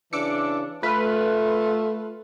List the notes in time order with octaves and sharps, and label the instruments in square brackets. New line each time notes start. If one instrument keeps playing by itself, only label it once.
[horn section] C#3 E3 D4 [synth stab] D6 E6 C#7
[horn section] A3 F4 [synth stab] B4 F6